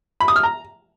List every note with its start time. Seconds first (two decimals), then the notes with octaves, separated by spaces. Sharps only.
0.21 B5
0.28 D#6
0.36 F6
0.43 A#5